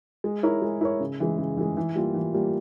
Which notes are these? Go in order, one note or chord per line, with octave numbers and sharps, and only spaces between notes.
G#3
E4 A#4 C#5
G#3
E4 A#4 C#5
C#3
E3 G#3
C#3
E3 G#3
E3
G3 A#3 F4
E3
G3 A#3 F4